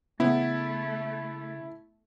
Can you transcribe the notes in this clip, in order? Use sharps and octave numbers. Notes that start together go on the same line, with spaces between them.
C#3 A3 B3 E4